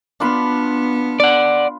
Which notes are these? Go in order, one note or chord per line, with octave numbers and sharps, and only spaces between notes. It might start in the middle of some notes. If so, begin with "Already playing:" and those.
B3 D4 F4 B5
D5 F#5